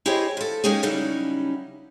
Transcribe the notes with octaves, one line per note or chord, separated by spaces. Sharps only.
E4 G4 G#4 C5 C#5 D#5
F3 A4
G#3 A#3 C#4 D#4 G4 G#4
C#3 F#3 G3 C#4 D#4 E4